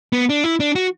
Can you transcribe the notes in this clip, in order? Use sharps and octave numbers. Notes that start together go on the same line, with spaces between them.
B3
D4
E4
D4
F#4